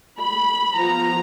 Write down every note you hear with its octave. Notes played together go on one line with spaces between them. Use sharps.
B5
F3 B3 A#5